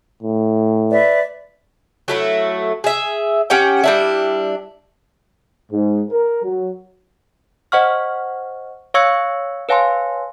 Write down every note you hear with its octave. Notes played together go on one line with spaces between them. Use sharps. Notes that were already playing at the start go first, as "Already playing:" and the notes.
A2
B4 D5 E5
F#3 A3 E4
G#4 E5
C#4 G4 F#5 G5
G3 D4 E4
G#2
A#4
F#3
C5 D#5 F#5 C#6 F6
C#5 F5 C#6 E6 G#6 C#7
B4 C#5 F5 G#5 A5 C6